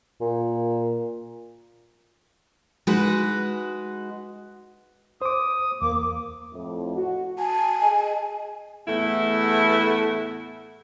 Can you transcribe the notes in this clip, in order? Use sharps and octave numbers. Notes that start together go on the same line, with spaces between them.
A#2
G#3 D#4 F#4 B4
C5 D6 D#6
E2 A#3 D6
F2 A2
F#4
G#5 A5
G#4 D#5
E2 A2 A3 B3 E4